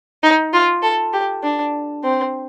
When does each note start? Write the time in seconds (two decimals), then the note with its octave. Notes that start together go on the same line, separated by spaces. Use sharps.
0.23 D#4
0.53 F4
0.83 A4
1.13 G4
1.43 D4
2.04 C4